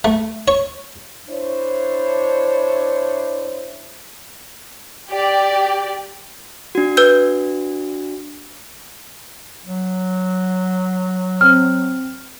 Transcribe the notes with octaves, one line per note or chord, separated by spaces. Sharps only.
A3
C#5
D4 E4 C5 C#5
G4 D5
D4 F#4
B4 E6 G6
F#3
C4 F6